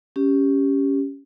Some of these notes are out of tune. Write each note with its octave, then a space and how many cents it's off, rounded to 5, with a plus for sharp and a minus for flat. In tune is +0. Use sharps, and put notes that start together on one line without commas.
C#4 +5 G4 +0